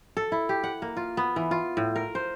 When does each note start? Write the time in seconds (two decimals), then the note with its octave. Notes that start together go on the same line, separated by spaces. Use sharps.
0.17 A4
0.32 E4
0.49 G4
0.64 F#5
0.82 A#3
0.97 F4
1.17 B3
1.36 E3
1.51 F4
1.77 A2
1.96 A#4
2.15 C5